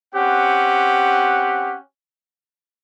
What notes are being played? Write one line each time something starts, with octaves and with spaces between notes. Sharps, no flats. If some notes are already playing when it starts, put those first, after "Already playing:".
C4 C#4 G4 F#5